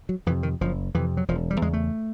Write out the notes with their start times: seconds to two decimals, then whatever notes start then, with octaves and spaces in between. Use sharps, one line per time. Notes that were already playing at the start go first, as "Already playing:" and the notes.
0.09 F#3
0.26 F2 E3
0.30 C3
0.43 D#3
0.61 F#1 F3
0.94 F2 C3 E3
1.17 F#3
1.28 E1 F3
1.51 G3
1.62 E2 C#3 G#3
1.73 A3